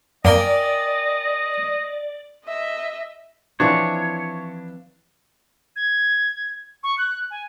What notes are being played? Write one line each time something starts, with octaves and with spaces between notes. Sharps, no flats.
F#2 A#3 A#4 D5 D#5 G5 G#5
D#5 E5
E3 F3 C4 D4 E4 C#5
G#6
C#6
F#6
G#5